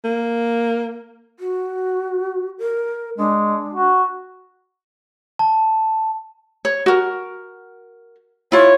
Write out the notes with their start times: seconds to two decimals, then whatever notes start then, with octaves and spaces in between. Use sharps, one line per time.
0.04 A#3
1.40 F#4
2.59 A#4
3.18 G#3 D4
3.74 F#4
5.39 A5
6.65 C#5
6.86 F#4 A#4
8.52 E4 F4 C#5